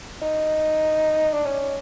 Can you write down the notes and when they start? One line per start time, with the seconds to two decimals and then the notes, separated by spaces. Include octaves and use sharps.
0.22 D#4
1.33 D4
1.45 C#4